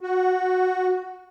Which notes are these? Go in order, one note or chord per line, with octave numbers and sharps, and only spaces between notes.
F#4